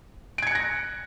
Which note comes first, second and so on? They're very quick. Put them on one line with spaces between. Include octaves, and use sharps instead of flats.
D7 G#6 C#7 F#6 A#6